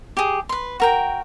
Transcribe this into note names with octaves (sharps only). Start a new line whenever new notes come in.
G4 G#4
B4 C6
F#4 A#4 G5